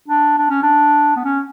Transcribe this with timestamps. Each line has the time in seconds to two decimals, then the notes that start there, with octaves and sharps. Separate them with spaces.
0.08 D4
0.38 D4
0.50 C#4
0.63 D4
1.16 B3
1.24 C#4